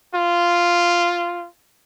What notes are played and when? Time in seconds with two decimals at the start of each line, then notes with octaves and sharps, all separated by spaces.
0.14 F4